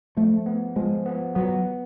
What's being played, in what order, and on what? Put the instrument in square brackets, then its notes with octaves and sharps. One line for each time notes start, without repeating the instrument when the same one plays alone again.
[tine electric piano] F3 [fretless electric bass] A3
[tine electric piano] B3
[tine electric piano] F3 [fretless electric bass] G#3
[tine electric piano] B3
[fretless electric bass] F#3 [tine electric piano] B3